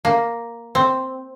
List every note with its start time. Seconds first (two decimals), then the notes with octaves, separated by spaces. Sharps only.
0.05 A#3
0.75 C4